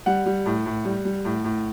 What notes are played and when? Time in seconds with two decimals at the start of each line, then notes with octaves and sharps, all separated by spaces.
0.06 G3 F#5
0.26 G3
0.46 A2
0.66 A2
0.85 G3
1.05 G3
1.25 A2
1.44 A2